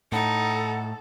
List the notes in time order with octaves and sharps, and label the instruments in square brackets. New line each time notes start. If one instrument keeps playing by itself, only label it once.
[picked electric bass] A2 [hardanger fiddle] D#4 [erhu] A4 [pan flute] F#5